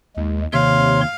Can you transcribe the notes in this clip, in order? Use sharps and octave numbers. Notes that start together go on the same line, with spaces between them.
D#2 G#3
D#2 C3 C#5 F5 C6